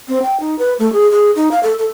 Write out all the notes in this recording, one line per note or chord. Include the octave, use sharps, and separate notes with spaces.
C4
G5
D#4
B4
A3
G#4
G#4
D#4
F5
A4
A4